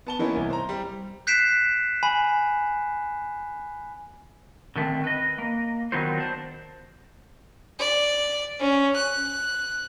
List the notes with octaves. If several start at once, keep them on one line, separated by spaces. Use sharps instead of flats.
B3 A5 G7
E3 A#3 B3 C#4 D#4 E4
C2
C5 A#5
G3
F#6 G6 B6 C7 D7 E7
G#5 B5
D3 D#3 A3 B3 C4
B4 D#5
A#3
D#3 F#3 B3 D#4 F4 C5
D4 C5
D5
C#4
F#6